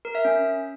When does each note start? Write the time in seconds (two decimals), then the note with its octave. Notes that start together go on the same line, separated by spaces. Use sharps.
0.05 A#4
0.15 E5
0.25 C#4